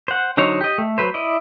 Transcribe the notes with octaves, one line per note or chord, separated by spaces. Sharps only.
C5 F#5
D3 F#3 D#4 C5 C#5
G4 D#5
A3
F#3 B4 C5
E4 D5 D#5